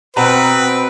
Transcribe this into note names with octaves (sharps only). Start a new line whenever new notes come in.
B2 C4 B4 F#5 A#5